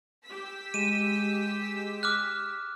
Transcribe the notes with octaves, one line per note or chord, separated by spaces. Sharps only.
G4 E6 B6
G#3 D#7 E7
D6 F6 F#6